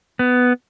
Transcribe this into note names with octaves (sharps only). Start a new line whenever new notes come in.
B3